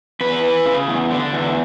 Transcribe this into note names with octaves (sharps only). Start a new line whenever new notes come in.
E2 B4
E3
C#3
E2
D3
E2